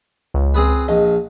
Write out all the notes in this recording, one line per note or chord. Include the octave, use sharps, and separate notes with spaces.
C#2
C4 G#4 B4
A#1 D#5